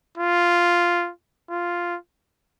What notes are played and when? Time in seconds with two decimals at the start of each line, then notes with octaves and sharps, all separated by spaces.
0.18 F4
1.50 F4